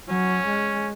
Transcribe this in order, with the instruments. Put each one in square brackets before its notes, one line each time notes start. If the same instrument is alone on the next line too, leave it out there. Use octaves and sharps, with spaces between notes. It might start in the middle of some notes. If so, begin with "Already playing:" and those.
[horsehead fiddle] F#3 [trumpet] C#4
[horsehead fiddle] G#3